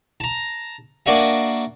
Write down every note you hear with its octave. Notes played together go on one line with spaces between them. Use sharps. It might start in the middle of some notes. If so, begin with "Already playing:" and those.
A5 A#5
A#3 D4 F#4 E5 G#5